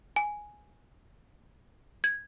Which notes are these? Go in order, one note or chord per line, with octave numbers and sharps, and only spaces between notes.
G#5
G#6